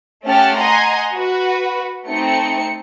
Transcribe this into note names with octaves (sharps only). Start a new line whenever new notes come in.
A3 C#4 G4 F#5 A5 F6
D#5 F#5 G#5 A#5 C6
F#4 B4
A3 C4 D#4 C#7